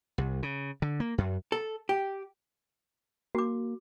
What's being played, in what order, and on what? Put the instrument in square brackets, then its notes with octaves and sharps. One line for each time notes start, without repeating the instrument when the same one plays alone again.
[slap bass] C2
C#3
D3
A#3
F#2
[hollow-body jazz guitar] A4
G4
[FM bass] A#3 [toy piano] F#4 D6